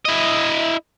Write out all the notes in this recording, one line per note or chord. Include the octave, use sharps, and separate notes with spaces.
E4 D#5